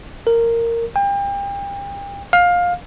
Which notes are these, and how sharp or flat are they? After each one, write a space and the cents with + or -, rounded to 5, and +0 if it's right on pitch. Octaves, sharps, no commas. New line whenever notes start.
A#4 -10
G5 +35
F5 +20